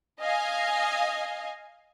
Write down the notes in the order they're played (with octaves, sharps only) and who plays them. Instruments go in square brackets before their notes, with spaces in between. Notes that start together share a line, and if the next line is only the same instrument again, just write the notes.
[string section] D#5 F5 G#5